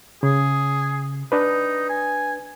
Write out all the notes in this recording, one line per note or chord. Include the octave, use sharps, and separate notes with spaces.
C#3 G#4
D4 D#4 B4
G#5